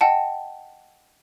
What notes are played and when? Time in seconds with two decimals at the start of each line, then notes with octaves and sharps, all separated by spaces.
0.01 D#5 F#5 G5 A5